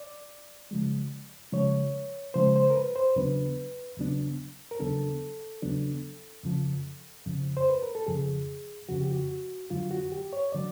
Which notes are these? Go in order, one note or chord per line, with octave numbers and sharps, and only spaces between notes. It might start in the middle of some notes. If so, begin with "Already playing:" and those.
Already playing: D5
C#3 F3 G#3
C#3 F3 G#3 C#5
C#3 F3 G#3 C5
C5
A#4
B4
C5
E2 C#3 F#3 B3 D4 B4
E2 C#3 F#3 B3 D4
A#4
E2 C#3 F#3 B3 D4 A4
E2 C#3 F#3 B3 D4
F2 C#3 F3
F2 C#3 F3
C5
B4
A#4
A4
F2 C#3 F3 G#4
F2 C#3 F3 F#4
G4
F#4
F2 D3 F#3 F4
F#4
G4
C#5
D3 F#3 D5